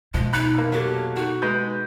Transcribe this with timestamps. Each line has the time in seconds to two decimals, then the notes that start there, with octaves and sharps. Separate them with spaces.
0.14 B2 F3 G#3
0.33 D#4 B5 F#6
0.54 F1 A#3
0.72 F#3 G4 A4
1.16 D#4 F#4
1.42 G#3 B4 G6